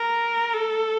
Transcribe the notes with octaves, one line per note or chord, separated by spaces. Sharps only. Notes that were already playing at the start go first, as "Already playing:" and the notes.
Already playing: A#4
A4